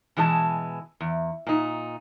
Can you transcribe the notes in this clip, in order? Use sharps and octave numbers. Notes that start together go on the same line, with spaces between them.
B2 E3 G#3 A#4 A5
E2
A#2 D#4